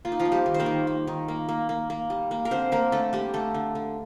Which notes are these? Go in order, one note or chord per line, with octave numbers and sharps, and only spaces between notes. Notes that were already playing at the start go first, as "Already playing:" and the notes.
A#3 F4
D#4
F3 F4
A#3
G3 G4
D#3
C5
A#3 A#4
D#3
A#3
D#3
A#3
A#3
A#3
A#3
G3
A#3
A#4
D3 C4 C5
D3 A#3 A#4
D3 A3 A4
G3 A#3 G4
D3 A3 A4
D3
D3